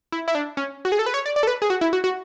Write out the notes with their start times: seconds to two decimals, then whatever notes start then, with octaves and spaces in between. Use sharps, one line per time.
0.12 E4
0.28 E4
0.35 D4
0.57 C#4
0.85 F#4
0.92 G#4
0.99 A4
1.06 B4
1.14 C#5
1.26 D5
1.36 D5
1.43 A4
1.47 B4
1.62 G#4
1.70 F#4
1.81 E4
1.93 F#4
2.04 F#4